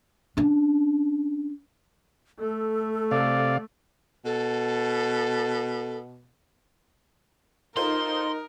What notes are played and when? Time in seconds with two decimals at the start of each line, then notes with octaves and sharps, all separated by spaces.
0.37 C#4 D4
2.39 A3 A4
3.11 C3 D5 F5
4.25 B2 A4
7.77 D#4 F4 A4 A#4 C5 C6